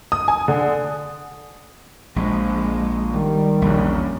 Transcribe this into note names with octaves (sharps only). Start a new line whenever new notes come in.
D#6
G#5
D3
A#1 F3 G#3
D#3 G3
A#1 E2 C#3